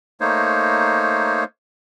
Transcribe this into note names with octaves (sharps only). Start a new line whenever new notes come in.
A3 A#3 D#4 C5 C#5